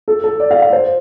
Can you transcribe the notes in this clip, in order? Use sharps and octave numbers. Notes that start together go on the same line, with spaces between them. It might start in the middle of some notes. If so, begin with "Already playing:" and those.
A4
A4
D5
F5
F5
C5